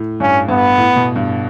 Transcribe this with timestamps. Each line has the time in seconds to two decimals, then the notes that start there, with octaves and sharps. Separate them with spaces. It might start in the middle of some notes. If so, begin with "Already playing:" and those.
Already playing: A2
0.20 G2 C#4
0.49 G2 B3
0.77 A2
0.96 B2
1.16 G2